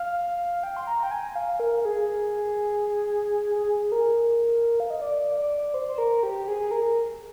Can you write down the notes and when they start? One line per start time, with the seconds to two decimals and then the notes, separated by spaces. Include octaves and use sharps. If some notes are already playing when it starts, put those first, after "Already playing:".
Already playing: F5
0.63 G5
0.77 C6
0.87 A#5
1.03 G5
1.11 G#5
1.35 F5
1.60 A#4
1.85 G#4
3.56 G#4
3.92 A#4
4.80 F5
4.90 D#5
5.02 D5
5.38 D5
5.74 C5
5.88 C5
5.98 A#4
6.23 G4
6.48 G#4
6.61 G#4
6.71 A#4